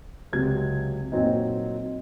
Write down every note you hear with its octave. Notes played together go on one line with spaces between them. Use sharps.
C#2 C3 F#3 G#6
A#2 F#3 C4 D#4